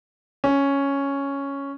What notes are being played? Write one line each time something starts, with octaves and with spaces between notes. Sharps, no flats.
C#4